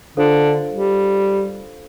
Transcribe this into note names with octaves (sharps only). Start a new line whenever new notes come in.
D3 D4 F4 A4 C5 F5
G3